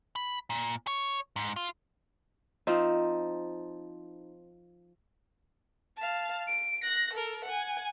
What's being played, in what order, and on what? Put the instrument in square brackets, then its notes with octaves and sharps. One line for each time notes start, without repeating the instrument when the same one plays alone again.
[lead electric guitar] B5
A#2
C#5
G#2
F4
[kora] F3 C4 D#4
[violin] F5 A5
D7
F#6 A#6
A4 A#4
F#5 G#5